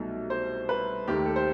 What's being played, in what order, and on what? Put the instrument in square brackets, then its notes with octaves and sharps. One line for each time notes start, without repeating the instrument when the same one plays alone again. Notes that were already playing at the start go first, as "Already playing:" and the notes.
Already playing: [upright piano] C2 B2 F#3 A3 D#4
C5
B4
D#2 D#3 A3 G4
A4
C5